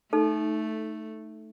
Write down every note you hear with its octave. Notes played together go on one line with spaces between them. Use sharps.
A3 D#4 A4